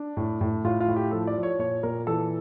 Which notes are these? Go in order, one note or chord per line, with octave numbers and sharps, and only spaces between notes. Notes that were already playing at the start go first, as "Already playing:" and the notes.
Already playing: D4
A2
A2
A2 F4
F4
A2
G4
F3 A4
D5
F3
C#5
A#2 C#5
A#2 A#4
E3 A4